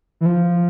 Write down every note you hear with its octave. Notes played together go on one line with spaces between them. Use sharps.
E3
F3